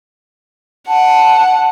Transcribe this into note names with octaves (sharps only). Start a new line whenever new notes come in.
F#5 A5